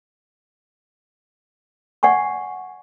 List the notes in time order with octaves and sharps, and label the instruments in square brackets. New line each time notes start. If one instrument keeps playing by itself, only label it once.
[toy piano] D5 F#5 G#5 C#6